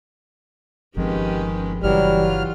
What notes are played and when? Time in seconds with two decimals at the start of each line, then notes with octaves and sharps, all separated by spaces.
0.97 G1 D#3 F3 G#3 C4 C#4 G4 B4
1.83 G1 C#3 E3 F#3 G3 F6
2.23 F4